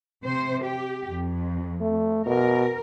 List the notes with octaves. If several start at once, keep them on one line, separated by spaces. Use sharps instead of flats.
C3 C5
G4
F2
A3
B2 A#4